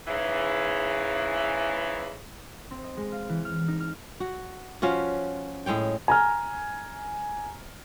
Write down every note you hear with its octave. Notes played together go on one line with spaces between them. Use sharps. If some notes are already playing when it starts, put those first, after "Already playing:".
G#2 C#3 E3
C4
D#5
G#3
F5
E3
F6
D#4
F6
F#4
F3 C#4 F4 F#4
A2 G#3 C#5 G5
G#5 A#5 F6